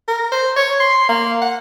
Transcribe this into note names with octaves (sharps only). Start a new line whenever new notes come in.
A#4
C5
C#5
C6
A#3
F#5